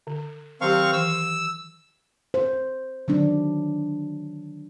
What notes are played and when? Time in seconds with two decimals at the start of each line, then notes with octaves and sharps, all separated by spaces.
0.07 D3
0.61 D#3 F#3 C4 G4 F5 C#6
0.93 E3 E6
2.34 C5
3.08 D3 D#3 F#3 D4